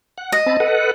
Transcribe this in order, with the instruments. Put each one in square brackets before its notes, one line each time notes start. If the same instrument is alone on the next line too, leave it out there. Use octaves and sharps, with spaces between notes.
[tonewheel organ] F#5
[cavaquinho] D#5
[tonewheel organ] C4 A5 B5
A4 B4 F#5